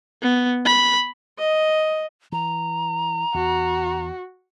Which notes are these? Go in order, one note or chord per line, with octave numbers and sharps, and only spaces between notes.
B3
B5
D#5
E3 A#5
E2 F#4